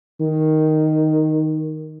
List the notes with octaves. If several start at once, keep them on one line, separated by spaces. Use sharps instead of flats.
D#3